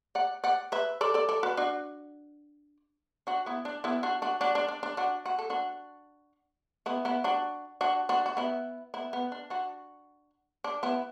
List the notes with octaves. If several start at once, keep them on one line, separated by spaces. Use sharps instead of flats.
D5 F#5
D5 F#5
B4 E5
A4 D5
A4 D5
A4 D5
F#4 B4
D4 F#4
D4 F#4
B3 E4
D4
B3 E4
D4 F#4
D4 F#4
D4 F#4
D4
D4
D4
D4 F#4
F#4
A4
D4 F#4
B3 E4
B3 E4
D4 F#4
D4 F#4
D4 F#4
F#4
B3 E4
B3 E4
B3
D4
D4 F#4
D4
B3 E4